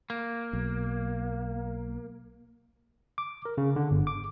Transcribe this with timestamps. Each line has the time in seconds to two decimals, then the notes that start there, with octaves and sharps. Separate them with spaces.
0.10 A#3
0.53 B1
3.18 D6
3.45 A#4
3.58 C#3
3.76 D3
3.91 G1
4.07 D6